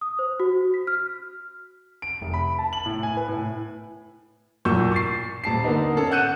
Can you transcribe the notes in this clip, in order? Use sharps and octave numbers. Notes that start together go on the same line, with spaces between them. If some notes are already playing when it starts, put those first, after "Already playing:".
D#6
C5
F#4
B6
F6
D7
F1
B5
A5
F#7
A2
G#5
B4
A2
B1 E2 A#2 C#6 E6 G6
C#6 A6 C7
D#1 A5 C7
D3 A#3 B3 D#4
C#4 A4
F#5 F#6 G6 C#7 D#7 E7